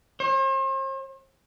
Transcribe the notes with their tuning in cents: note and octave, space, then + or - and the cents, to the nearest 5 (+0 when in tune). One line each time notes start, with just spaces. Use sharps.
C5 +45